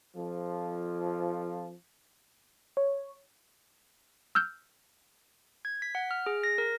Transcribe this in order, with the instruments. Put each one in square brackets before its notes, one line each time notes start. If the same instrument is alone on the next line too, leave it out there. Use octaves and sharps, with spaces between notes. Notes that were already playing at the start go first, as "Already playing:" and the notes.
[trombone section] F2 F3
[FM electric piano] C#5
[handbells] E6 F6 G6
G#6
B6
F#5
F6
G#4
A#6
A#4